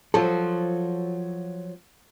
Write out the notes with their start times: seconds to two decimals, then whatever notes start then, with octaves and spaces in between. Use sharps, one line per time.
0.14 F3 F#3 F4 A4